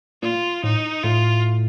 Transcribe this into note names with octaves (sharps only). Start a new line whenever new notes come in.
A#2 F4
A2 D#4
A2 F4